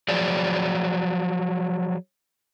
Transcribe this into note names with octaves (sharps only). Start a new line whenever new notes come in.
F3 F#3 G#4 D5